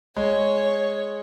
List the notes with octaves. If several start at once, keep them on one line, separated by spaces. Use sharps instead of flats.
G#3 C#5